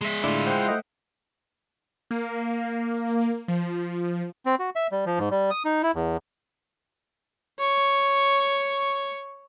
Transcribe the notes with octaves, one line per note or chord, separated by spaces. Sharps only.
G#3 E5
A2 D3 E4 F4 D5
C5 F#5 G5
A3 D#5 E5
A#3
F3
C4
F#4
E5
G3
F3
G#2
G3
D#6
D#4
E4
E2
C#5 C#6